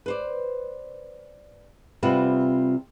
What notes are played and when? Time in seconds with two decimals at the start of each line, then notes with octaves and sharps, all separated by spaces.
0.06 B4 C5 D5
2.03 C3 G3 C4 F4 B4 F#5